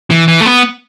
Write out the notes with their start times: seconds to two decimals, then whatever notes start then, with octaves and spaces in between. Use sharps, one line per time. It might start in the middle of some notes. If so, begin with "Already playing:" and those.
0.10 E3
0.28 E3
0.41 A3
0.46 B3